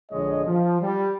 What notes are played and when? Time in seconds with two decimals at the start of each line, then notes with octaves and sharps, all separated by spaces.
0.12 A#1 D3 G#3 C#5 D#5
0.45 F3
0.82 G3